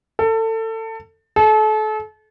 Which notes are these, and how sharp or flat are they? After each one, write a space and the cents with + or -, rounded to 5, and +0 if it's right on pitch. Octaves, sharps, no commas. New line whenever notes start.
A4 +25
A4 -35